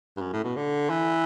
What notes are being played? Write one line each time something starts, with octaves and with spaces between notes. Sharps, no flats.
G2
F#2
A2
B2
D3
E3